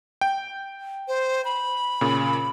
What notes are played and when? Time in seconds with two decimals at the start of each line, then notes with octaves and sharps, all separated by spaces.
0.21 G5
1.08 C5
1.45 B5
2.01 A#2 C#3